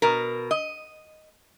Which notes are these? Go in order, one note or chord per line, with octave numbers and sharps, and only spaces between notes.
B2 A#4
D#5